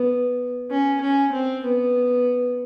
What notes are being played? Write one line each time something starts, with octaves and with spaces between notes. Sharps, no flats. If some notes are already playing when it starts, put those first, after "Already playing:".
Already playing: B3
C#4
C#4
C4
B3